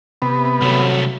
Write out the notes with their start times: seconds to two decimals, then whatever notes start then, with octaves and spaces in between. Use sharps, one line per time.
0.22 C3 B3
0.61 C2 F#3 A3